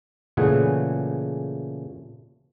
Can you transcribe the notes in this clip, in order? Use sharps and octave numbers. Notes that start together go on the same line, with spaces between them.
A#2 C#3 E3 A3 G#4 F#5